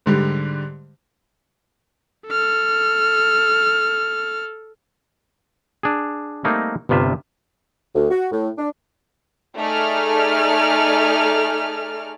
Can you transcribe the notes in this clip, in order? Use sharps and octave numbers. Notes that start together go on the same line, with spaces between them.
G#2 D3 G3
A4 F6
D4 G#4
G3 A3 A#3 C4 D#4
G1 G2 C3 F4 E5
D2
F#4
A2
D4
A3 D#4 G#4 A4 D5 F6